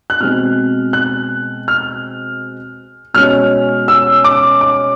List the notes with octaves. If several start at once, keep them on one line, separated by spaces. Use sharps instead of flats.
F#6
B2 G#3 C4 F6
F#6
F6
B2 G#3 C#4 F6
E6
D6
D6